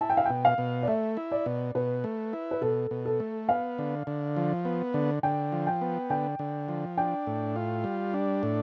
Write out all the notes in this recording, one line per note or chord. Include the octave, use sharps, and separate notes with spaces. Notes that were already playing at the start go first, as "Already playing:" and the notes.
E4 A5
G5
F5
B2 G5
F5
B2
D5
A3 E5
E4
D5
B2
B2 B4
A3
E4
B4
B2 A4
B2
A4
A3
B3 F5
D3
D3
F3
B3
D3
D3 G5
F3
G5
B3
D3 G5
D3
F3
D4 G5
A2
F4
G3
D4
A2